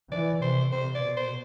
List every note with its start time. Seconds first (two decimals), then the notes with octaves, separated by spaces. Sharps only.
0.11 E3 D5
0.41 C3 C5
0.72 C3 C5
0.95 D5
1.02 B2
1.17 C5